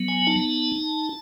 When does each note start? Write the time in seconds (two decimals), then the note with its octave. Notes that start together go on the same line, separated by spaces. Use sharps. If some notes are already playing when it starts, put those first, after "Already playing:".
Already playing: F#3 B3
0.08 G#5
0.27 D#4 A5